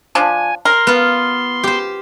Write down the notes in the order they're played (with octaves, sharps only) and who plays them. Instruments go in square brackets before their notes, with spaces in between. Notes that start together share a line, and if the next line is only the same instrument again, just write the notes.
[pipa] F3 D4 [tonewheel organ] G#5
[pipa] A#4 [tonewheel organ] C6
[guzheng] B3 F4
G4 C5